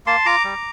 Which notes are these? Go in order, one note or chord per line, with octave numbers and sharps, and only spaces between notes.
A#3 A5 C6
F4 A#5 D6
G3